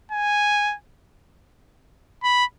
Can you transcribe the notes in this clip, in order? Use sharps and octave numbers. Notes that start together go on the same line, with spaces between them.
G#5
B5